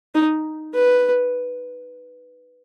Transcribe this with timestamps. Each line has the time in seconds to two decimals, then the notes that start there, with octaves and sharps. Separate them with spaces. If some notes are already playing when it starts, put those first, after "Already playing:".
0.15 D#4
0.74 B4